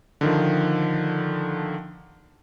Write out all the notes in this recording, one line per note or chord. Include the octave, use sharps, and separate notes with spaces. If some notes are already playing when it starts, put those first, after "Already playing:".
D3 D#3 F3